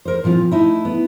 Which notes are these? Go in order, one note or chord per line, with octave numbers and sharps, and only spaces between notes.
A#4 C5
A#2 F3 C4 F4
A3 D#4 E4
B3